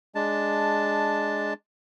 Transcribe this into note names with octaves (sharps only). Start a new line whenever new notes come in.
G#3 D4 A5